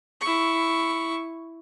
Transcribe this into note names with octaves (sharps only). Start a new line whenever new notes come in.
E4 C#6